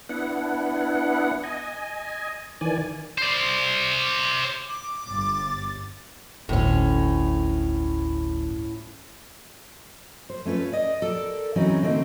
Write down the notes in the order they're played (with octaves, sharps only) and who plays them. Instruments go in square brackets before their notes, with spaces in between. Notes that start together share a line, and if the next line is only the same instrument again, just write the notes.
[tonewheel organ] B3 D4 E4 F#5
D#5 G#5
D#3 E3 D5 G#5
[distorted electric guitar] C5 D5
[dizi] D6
[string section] G1 A6
[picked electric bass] G1 D2 [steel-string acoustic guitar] A2 C#4
[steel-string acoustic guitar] C5
A3 C#4 F4 B4
D5 D#5
A4 A#4 D5
E3 F#3 C4 C#4 D#4
D3 A3 A#3 C4 D#4